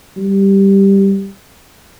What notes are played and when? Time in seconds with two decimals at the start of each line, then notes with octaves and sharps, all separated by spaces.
0.17 G3